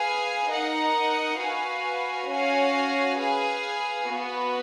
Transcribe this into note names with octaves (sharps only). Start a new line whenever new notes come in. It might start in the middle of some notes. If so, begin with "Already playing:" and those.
Already playing: G#4 B4 F5 G#5
D#4 A#4 D#5 F#5
F#4 B4 F5 G#5
C#4 F#4 C#5 F5 G#5
G#4 B4 F5 G#5
B3 F#4 B4